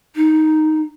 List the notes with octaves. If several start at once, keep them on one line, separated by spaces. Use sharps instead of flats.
D#4